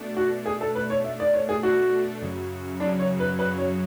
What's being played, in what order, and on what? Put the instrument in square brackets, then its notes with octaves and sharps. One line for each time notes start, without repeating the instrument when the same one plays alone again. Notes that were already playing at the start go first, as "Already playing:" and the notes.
Already playing: [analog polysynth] B2 A3 D4
[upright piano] F#4
[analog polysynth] B2 A3 D4 [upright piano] G#4
[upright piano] A4
B4
C#5
[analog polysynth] B2 A3 D4 [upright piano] E5
[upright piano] D5
C#5
G#4
[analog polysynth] B2 A3 D4 [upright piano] F#4
[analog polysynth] F#2 C#3 F#3
[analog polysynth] F#2 C#3 F#3 [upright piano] D4
[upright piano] C#5
B4
[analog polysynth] F#2 C#3 F#3 [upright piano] B4
[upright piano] C#5